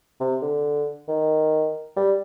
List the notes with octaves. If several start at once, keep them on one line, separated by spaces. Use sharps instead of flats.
C3
D3
D#3
G3